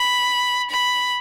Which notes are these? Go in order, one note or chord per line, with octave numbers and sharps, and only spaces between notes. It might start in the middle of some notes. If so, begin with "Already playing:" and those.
Already playing: B5
B5